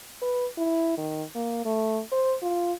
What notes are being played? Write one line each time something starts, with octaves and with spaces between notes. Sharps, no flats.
B4
E4
D#3
A#3
A3
C5
F4